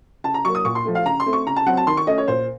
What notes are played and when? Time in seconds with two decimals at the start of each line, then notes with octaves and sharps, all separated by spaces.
0.24 C#3 A5
0.34 A#5
0.45 F#3 A#3 C#6
0.55 D#6
0.65 A#2 C#6
0.75 C6
0.85 F3 A3
0.95 F5
1.05 C#3 A#5
1.20 C6
1.26 A3 C4
1.33 C#6
1.46 C#3 A#5
1.56 A5
1.66 F#3 C4 F#5
1.77 A5
1.87 D#3 C6
1.97 C#6
2.07 A3 C#4 D#5
2.18 C#5
2.28 A#2 C5